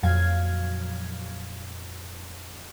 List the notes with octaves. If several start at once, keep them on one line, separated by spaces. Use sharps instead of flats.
F2 A#2 F#3 F5 G#6